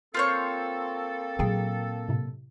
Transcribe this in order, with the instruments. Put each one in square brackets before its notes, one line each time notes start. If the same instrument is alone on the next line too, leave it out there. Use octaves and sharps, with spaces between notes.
[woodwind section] A#3 C4 A4 [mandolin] F4 C5 C#5
[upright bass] A#2 F#3 [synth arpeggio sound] G#4 G5
[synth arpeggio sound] A2 C3